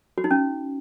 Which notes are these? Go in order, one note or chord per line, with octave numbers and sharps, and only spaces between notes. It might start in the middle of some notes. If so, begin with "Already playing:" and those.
F#4
D#4
C#4